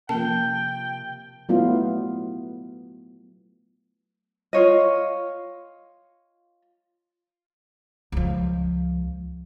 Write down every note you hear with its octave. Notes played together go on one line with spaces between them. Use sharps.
C3 F3 A#3 G5 A5
F#3 A3 B3 E4 F4
F4 C#5 D#5
C#2 F3